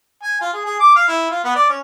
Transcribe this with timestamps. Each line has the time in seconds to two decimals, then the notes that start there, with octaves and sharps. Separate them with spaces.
0.23 G#5
0.41 F4
0.53 G#4
0.65 G#4
0.80 D6
0.96 F5
1.08 E4
1.31 F4
1.44 B3
1.55 D5
1.69 C#4